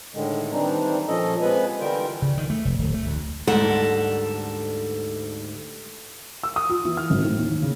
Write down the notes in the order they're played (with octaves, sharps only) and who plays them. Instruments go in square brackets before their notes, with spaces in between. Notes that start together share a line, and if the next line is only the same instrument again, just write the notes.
[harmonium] A2 D3 D#3 G#3
D#3 E3 G3 C4 D4 D#4
A#2 F3 C#4 A4 D#5
C3 F3 G#3 B3 B4 G#5
D3 E3 G3 F4 A#4 G5
[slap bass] C#3
D#3
A3
F1
D1
A3
D2
[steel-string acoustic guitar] D2 G#2 G3 A4 A#4 F#5
[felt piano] E6
D#6
F4
E3
F6
G#1
A2
D#2
C#3